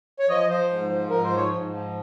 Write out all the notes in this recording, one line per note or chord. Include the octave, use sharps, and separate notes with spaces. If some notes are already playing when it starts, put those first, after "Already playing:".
C#5
F3 D#5
F3 C5
G#2
F3
G#2 A#4
C5
F3
C#5
G#2
F3